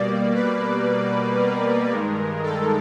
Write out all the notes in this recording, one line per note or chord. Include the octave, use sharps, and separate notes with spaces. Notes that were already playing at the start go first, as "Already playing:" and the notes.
Already playing: B2 G3 A#3 D5
B4
A#4
G2 D#3 G#3
A4